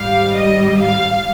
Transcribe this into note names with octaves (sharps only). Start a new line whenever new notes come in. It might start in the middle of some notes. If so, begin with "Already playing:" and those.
Already playing: G#1 G#2 G3 F5
D#5
F5